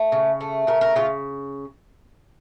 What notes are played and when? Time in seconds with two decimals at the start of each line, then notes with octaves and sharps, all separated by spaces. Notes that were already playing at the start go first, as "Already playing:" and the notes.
Already playing: A3
0.12 C#3
0.41 A3
0.67 C#3 A#4
0.81 A#4
0.96 C#3 F4